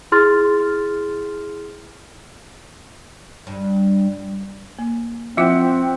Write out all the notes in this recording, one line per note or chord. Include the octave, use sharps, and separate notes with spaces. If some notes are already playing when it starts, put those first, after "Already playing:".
E4 G#4 C6 F6 A6
G2
A#3
F3 C4 E4 F4 E5 F#5 G5